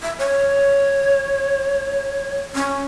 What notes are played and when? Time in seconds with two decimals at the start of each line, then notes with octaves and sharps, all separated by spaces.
0.03 E5
0.19 C#5
2.55 C#4